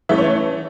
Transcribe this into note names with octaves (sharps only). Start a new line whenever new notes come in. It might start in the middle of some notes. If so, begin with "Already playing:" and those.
E3 A3 C#4 E5
C#5